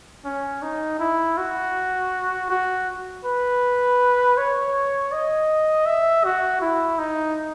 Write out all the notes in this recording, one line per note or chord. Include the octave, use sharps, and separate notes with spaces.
C#4
D#4
E4
F#4
F#4
B4
C#5
D#5
E5
F#4
E4
D#4